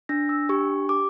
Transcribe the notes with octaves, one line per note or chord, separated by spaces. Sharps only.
D4 A#6
E6
G4 C#6
G4 D6